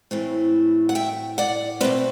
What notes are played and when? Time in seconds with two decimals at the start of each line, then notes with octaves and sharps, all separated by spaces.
0.11 A2 E3 A3 C4
0.89 F#5
0.95 E5 G5
1.38 D5 F#5
1.81 B2 A3 C4 B4 D5